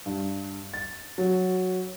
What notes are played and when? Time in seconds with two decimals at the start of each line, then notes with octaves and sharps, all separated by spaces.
0.06 G2
0.74 A6
1.18 F#3